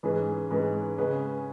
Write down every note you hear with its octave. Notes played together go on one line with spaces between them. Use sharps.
G#2 E3 C#4 G#4 B4
G#2 E3 C#4 G#4 B4
C#3 G#3 C#4 G#4 B4